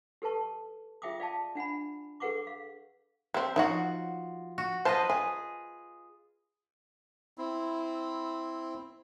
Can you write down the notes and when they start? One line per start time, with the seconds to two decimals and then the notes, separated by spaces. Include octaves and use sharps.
0.22 G4 A4 B4 A5 C#6
1.02 F4 G#4 E5 G5 D6 D#6
1.20 D5 F5 G5 A5
1.55 D4 F#5 G#5 B5
2.20 G#4 A4 B4 F#5 C#6 D6
2.47 F5
3.34 G3 C4 E5
3.56 F3 D#4 F#4 C#5 F#5
4.58 F#4
4.85 F4 B4 C5 D#5 A5
5.10 G#4 G#5
7.38 C4 E4